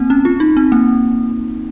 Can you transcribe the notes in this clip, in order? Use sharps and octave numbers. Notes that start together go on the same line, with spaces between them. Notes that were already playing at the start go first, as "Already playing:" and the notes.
Already playing: A#3 C4
C#4
F4
D#4
C4
A#3